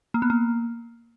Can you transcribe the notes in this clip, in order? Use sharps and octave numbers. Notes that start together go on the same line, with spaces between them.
A#3
B3
A#3